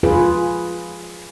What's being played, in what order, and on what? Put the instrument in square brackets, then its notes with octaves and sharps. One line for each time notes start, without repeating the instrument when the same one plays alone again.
[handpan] F4 G#4 B4